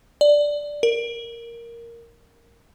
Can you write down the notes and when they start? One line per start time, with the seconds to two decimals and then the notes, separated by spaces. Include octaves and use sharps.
0.21 D5
0.83 A#4